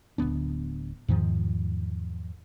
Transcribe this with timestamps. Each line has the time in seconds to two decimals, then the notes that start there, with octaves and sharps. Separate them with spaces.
0.18 D1 D2 B3 D4
1.08 E2 G#2 D#3 F3